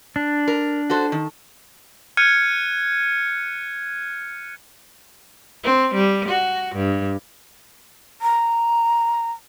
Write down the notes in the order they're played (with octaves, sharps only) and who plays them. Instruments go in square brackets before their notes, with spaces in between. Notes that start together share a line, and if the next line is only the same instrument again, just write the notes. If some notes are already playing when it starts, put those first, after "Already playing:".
[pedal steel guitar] D4
[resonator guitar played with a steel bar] A#4
F#4 A4 C5
D#3
[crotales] F6 F#6 G#6 C#7 D#7
[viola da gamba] C4
G3
F#4
G2
[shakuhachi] A#5